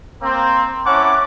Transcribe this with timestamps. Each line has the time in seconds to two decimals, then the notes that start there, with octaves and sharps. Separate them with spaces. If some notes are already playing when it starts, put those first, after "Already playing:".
0.22 A#3 C4
0.86 C#4 E4 C#5 F#5 A5 D6